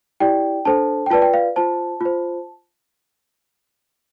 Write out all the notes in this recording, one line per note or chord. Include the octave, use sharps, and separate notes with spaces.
E4 G4 D5 G5
D4 A4 C5 A5
G5
F4 B4 D5 A5
G5
F5
F4 C5 A5
F4 C5